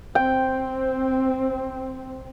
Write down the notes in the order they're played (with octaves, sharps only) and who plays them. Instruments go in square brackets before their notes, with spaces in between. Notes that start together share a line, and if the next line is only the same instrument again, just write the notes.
[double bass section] C4 [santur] G5